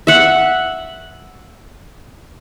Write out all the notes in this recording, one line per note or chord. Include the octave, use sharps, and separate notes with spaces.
E5 F#5